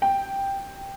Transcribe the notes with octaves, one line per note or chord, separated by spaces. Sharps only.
G5